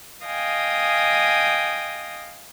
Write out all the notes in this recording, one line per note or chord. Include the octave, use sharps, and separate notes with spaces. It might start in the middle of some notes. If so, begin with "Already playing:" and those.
D#5 F5 G5 G#5 D#6